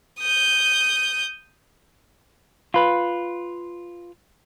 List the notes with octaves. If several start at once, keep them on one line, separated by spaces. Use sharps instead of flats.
D#6 G6
F4 B4